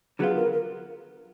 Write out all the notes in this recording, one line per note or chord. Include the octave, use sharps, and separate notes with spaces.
D3 F#3 B3 F4 G#4
A#4
A#4